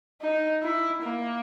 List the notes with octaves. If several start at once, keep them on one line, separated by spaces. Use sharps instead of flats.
D#4
E4
A#3